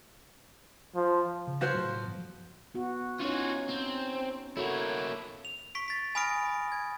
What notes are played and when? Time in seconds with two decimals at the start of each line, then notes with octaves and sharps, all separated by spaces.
0.96 F3
1.47 C#3
1.61 F3 F#4 C5
1.74 A2 F#3
2.05 G1 F3
2.74 B3 F#4
3.20 C#4 D#4 F4 F#4 C#5
3.69 C4
4.57 A#3 E4 F#4 A4 C#5
5.45 F7
5.75 C#6 B6 D7
5.88 A6 B6
6.15 G#5 B5 D#6 F6 A#6 D7
6.72 G#6